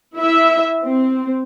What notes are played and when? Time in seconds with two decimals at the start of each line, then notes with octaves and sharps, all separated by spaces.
0.16 E4 E5
0.84 C4